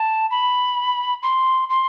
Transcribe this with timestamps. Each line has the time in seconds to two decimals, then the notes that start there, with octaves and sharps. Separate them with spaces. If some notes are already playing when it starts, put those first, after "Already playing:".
Already playing: A5
0.31 B5
1.23 C6
1.70 C6